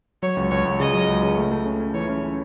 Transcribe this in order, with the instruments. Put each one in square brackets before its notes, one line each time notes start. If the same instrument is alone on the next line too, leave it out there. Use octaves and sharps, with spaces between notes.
[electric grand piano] F#3 [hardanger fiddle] C#5
[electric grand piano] C#2
[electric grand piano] C#2 [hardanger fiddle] C#5
[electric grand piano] C#2
[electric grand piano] C#3 [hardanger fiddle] D#5
[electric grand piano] F#3
C#2
C#3
A3
A3
C#4
C#4
[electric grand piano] E3 [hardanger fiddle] C#5
[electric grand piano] C#4
C#4